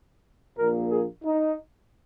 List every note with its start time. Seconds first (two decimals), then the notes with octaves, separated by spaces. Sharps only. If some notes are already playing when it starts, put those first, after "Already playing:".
0.57 A#1 A#2 A#3 A#4
0.90 G#4
1.23 D#4